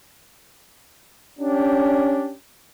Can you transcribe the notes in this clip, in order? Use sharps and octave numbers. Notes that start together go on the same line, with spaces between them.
C#4 D4 G4